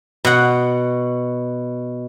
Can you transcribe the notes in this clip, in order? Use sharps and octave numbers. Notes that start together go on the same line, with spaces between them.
B2 F#5